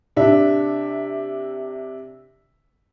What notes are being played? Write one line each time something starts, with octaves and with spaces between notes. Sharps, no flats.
C3 D4 E5